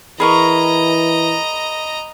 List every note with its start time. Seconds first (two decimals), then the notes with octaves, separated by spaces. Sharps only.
0.20 E3 G#4 A#4 D#5 A#5 B5 C#6